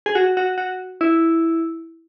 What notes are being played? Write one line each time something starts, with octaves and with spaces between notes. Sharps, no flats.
G#4
F#4
F#4
F#4
E4